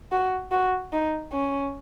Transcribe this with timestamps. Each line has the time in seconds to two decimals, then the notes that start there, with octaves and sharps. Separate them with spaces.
0.12 F#4
0.51 F#4
0.93 D#4
1.32 C#4